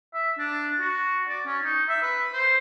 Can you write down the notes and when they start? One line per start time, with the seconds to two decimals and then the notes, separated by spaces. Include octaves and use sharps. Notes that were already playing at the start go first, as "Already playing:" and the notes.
0.14 E5
0.38 D4
0.80 F#4
1.28 D5
1.46 C#4
1.63 D#4
1.89 E5
2.02 B4
2.32 C5